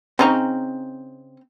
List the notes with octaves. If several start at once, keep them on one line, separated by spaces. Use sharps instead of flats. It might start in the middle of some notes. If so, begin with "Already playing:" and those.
C#3 C4 C#4 D#4 A#5